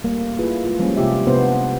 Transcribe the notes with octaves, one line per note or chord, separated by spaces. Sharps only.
G3 A3 A#3
E4 F4 G#4 B4
G#3 F4
F3 G3 G#3 A#3 C#4
C3 G#3 F4 G4 E5
C3 B3 D4 C5